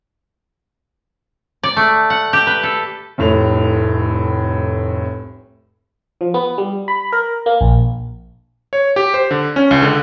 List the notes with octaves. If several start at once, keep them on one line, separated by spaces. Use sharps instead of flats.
D5
A3
F#5
G4
B4
A4
F1 C2 A2 F7
F3
B3
G3
B5
A#4
A#3
A#1
C#5
G4
C5
D3
C#4
C#2
D3